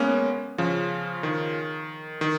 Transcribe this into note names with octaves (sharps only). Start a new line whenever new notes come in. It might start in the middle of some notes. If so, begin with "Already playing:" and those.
Already playing: G#3 A#3 B3 C#4
C#3 F3
D#3
D#3